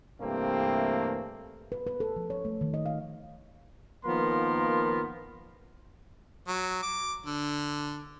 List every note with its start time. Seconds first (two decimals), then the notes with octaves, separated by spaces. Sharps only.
0.20 G2 C3 E3 A3 A#3 C4
1.72 B4
1.87 B4
2.00 A4
2.16 F3
2.30 C#5
2.45 A3
2.61 D#3
2.74 D#5
2.86 F5
4.06 D#3 F3 A#3 B3 A#4 C6
6.48 F#3
6.82 D6
7.26 D3